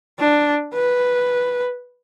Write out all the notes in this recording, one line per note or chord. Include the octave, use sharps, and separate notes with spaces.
D4
B4